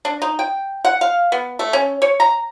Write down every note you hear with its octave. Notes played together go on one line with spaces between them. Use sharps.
D4
D#4
G5
F#5
F5
B3
A3
C#4
C#5
A#5